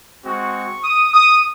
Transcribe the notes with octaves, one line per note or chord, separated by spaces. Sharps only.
G#3 C4 F#4 C#6
D#6
D#6